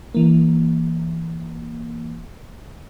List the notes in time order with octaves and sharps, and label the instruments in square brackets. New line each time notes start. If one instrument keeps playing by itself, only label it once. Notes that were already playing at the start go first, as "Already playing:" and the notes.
[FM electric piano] E3 A#3